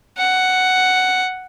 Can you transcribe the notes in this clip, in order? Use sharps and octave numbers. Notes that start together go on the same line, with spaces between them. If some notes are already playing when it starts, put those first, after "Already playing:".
F#5